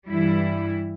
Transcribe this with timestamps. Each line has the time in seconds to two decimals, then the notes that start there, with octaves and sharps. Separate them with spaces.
0.08 G2 E3 G3 E4